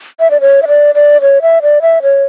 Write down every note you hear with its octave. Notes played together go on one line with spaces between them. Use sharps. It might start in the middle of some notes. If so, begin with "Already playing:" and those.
E5
D5
C#5
E5
D5
D5
C#5
E5
D5
E5
C#5